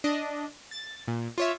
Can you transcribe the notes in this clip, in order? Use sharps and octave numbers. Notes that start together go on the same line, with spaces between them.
D4 D#5
A6
A#2
F4 C#5 E5